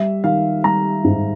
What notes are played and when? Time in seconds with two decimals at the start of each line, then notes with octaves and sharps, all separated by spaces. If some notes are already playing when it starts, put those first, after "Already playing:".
Already playing: G3 E5
0.24 D#3 F5
0.64 G3 A#5
1.05 G#2